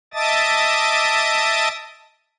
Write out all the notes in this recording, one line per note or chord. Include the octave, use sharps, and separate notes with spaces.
D#5 E5 A5 D6 D#6 A6